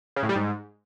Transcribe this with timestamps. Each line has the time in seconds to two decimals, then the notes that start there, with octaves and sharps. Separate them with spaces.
0.16 C#3
0.23 A2
0.29 G3
0.36 G#2